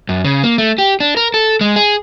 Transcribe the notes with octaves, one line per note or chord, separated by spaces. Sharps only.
F#2
C#3
A#3
A3
G4
D4
A#4
A4
G#3
G#4